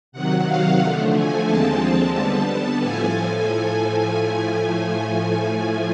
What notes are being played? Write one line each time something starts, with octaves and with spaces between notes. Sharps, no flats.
C3 D#3 F#3 F#5
F5
D3 F3 A3
G#5
D#2 D3 F3 G#3 C4 A5
D3 G3 B3
A2 F3 A3 G#5